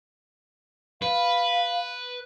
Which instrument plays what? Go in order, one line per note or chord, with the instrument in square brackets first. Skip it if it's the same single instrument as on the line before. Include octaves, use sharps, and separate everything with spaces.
[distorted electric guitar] B4 [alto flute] F5